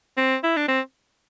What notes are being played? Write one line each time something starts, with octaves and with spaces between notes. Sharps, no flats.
C4
E4
D4
C4